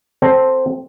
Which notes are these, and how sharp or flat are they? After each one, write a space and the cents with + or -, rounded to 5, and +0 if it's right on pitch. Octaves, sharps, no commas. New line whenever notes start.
C4 +0 A4 +0